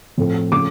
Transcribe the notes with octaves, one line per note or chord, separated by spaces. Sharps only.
A2 F3 A3 C4
C#3 F3 A3 D6